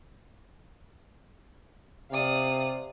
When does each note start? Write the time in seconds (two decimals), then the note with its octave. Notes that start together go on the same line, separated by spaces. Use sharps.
2.11 C3 D5 F5 D#6